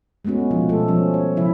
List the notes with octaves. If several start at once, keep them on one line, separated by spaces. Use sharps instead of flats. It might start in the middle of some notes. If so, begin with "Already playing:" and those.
G#3 A3 B3 C#4 F#4
B2 F3 F4
B2 G3 A3 B3 A4
F3 C#4
C#5
C#3 F3 E4 E5